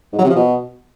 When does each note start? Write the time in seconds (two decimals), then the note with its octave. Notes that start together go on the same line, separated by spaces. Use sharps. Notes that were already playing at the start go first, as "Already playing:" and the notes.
0.13 G#2
0.18 F#3
0.24 C3
0.30 F3
0.35 B2